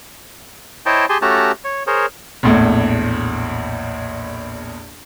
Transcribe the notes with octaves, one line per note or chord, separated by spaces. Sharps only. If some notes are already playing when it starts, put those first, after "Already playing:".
E4 C5 C#5 D#5 G5 A5
G4 G#4 G#5 A5 C6
A3 C#4 F#4 G4 A5 A#5
C#5
G#4 A#4 C5 C#5
A#1 E2 A2